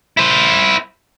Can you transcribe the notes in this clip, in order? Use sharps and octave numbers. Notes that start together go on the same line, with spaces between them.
E4 C5